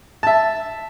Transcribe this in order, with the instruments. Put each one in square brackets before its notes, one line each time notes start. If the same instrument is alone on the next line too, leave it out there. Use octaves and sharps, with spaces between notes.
[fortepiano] E5 A5